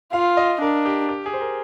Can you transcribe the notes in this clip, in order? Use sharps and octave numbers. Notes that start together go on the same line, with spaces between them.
F4 F5
D#5
D4 A#4
G4
G4
G#4
C5
A#4